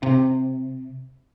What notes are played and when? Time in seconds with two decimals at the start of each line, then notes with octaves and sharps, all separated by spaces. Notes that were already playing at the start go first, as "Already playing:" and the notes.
0.03 C3